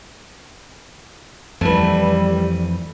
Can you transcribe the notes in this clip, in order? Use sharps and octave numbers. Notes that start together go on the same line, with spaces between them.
F2 E3 G3 A3 B4